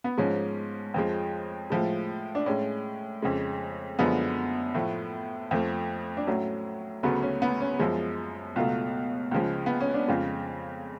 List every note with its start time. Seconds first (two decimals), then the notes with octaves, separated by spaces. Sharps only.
0.04 B3
0.18 G#2 F3 G#3 C#4
0.94 F2 F3 G#3
1.70 A2 F3 G#3
2.35 D4
2.46 A2 G#3 C#4
3.22 F2 C#3 G#3
3.99 F#2 D3 F3 G#3 B3
4.74 A2 F3 A3
5.51 F2 F3 A3
6.17 D4
6.27 A2 F#3 A3 C#4
7.03 D2 C#3 F#3 A3 B3
7.22 C#4
7.42 B3
7.61 C#4
7.79 F#2 F3 G#3
8.56 C#2 B2 F#3 A3 F4
9.31 C#2 C#3 F3 G#3
9.66 B3
9.81 C#4
9.94 D4
10.08 F2 C#3 G#3 F4